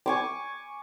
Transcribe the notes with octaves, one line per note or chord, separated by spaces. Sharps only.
G#5 C#6 D6